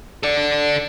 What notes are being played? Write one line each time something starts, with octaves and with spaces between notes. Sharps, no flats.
A4 D5